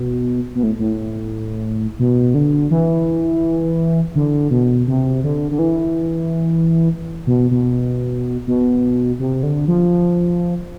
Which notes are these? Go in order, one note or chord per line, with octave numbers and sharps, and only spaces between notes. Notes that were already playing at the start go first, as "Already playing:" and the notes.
Already playing: B2
B2
A2
A2
B2
D3
E3
D3
B2
C3
D3
D3
E3
B2
B2
B2
C3
D3
F3